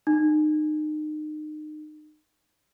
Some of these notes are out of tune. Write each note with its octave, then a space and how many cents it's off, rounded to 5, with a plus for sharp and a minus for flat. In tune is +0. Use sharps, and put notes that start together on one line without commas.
D#4 -30